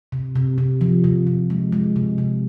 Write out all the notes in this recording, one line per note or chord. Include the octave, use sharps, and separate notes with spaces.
C3
C3
C3
F3
C3
C3
G#3
G#3
C3
C3